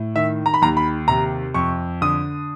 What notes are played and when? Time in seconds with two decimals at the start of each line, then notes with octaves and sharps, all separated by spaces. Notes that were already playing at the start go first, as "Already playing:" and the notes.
Already playing: A2
0.15 D#3 E5
0.46 A#5
0.54 B5
0.62 D#2 A#5
0.77 B5
1.08 C3 A#5
1.54 F2 C#6
2.01 D3 D#6